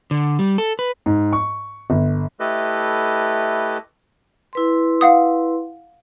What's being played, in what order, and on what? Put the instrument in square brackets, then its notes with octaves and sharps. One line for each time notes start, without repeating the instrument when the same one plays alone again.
[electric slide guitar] D3
G3
A4
B4
[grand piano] G#2
C#6
G1
[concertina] A3 E4 G4 A4 B4 D#5
[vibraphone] E4 B4 C6
[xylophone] F5 F#5 D#6